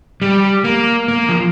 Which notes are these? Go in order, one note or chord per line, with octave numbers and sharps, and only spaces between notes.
G3
A#3
A#3
F3